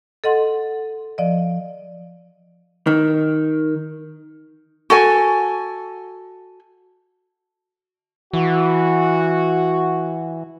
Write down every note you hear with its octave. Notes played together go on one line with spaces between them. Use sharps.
A4 D#5 F#5 C6
F3 D5 D#5
D#3
F#4 A4 G#5
E3 F#4